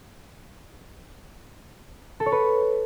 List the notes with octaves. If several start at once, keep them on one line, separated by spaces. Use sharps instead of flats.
A4
C#5
B4